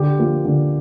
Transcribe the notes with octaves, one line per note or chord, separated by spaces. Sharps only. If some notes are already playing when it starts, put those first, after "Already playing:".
Already playing: D3 G4
F3 A#3
D3